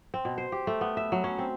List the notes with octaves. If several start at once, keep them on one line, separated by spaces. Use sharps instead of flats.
C4
B2
C5
G4
A3
B3
E5
F#3
C#4
C4